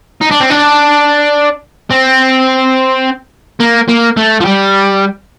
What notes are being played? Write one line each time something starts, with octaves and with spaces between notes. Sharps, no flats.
D#4
D4
C4
D4
C4
A#3
A#3
A3
F3
G3